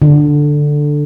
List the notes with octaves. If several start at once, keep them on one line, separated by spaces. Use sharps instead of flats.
D3